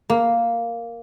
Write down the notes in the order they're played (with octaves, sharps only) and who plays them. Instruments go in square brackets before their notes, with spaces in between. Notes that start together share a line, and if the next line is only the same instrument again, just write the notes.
[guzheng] A#3